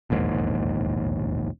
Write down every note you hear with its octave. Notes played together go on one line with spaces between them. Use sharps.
E1 A#1 D#2 G#2